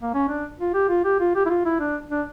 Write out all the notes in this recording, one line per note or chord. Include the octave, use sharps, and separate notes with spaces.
A#3
C#4
D4
F4
G4
F4
G4
F4
G4
E4
F4
E4
D4
D4